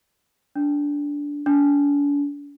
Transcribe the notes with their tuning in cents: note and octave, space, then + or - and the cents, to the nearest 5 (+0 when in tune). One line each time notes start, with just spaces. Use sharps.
D4 -15
D4 -45